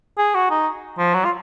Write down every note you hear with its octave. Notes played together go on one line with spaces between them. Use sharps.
G#4
F#4
D#4
F3
F#3
F4